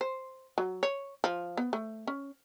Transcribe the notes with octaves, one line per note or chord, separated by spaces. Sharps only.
C5
F#3
C#5
F3
B3
A3
C#4